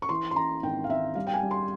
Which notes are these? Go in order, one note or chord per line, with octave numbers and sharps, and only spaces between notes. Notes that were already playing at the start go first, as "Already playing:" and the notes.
C#6
E3 C6
C6
E3 A#5
G#1 G5
F5
G#1 E5
G3 F5
G5
G#5
G3
C6